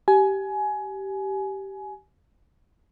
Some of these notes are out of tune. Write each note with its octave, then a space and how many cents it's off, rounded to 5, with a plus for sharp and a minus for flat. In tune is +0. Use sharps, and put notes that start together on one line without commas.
G4 -15 G#5 +20